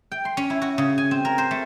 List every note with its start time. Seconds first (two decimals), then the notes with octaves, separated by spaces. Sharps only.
0.12 G5
0.25 C6
0.37 C#4
0.50 E4
0.62 F#4
0.78 C#3
0.98 G#5
1.11 C4
1.25 A#4
1.38 C5
1.51 A3